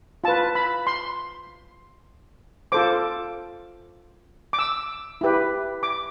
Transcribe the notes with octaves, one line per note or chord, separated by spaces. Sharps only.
F4 B4 A5
B5
C6
F4 A4 C5 D6
D6
E6
E4 G4 B4
D6